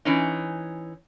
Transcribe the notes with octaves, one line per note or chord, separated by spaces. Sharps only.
E3 C#4 D#4